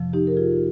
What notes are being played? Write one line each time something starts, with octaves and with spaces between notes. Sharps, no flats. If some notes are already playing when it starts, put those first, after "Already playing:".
Already playing: F2 C3 F3
D#4 G4
A#4
F4 G#4